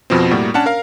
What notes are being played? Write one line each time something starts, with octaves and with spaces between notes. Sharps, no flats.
F2 B2 F3 C4
A2 G3 A#3 F#4
C#4 D4 C#5 F#5 A5
A#4 F5